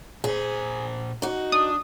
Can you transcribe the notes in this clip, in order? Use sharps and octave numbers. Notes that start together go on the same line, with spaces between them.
A#2 G#4 C5
D#4 F#4
D4 D#6